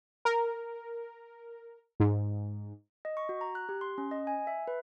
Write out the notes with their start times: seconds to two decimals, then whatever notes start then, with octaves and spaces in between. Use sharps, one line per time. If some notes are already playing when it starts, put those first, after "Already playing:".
0.25 A#4
2.00 G#2
3.05 D#5
3.17 C#6
3.29 F#4
3.41 A#5
3.55 F#6
3.69 G4
3.81 C6
3.98 C#4
4.11 D#5
4.27 G#5
4.47 E5
4.68 B4